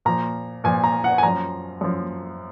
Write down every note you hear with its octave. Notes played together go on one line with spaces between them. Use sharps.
A#2 F3 A#5
A#2 F3 G#5
A#5
F#5
G#5
F#2 F3 A#5
F#2 F3